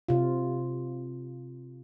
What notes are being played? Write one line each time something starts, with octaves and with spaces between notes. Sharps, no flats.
C3 F4